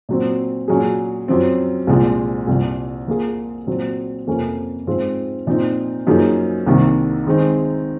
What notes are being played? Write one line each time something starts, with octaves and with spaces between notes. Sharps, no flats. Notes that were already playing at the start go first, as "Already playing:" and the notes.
A#2 F#3 C4
A#2 F#3 C#4 G#4
F#2 F3 C4
C2 A#2 F3 G#3
C2 A#2 F3
F3 A#3 F4 G#4
A#2 F#3 C4
F2 C3 F3 A#3 C#4
G#2 F3 C4 F4
A#2 F3 C4 D#4
F#2 F3 A#3 D#4 G#4
C2 C3 D#3 A#3
D#3 G#3 C4 D#4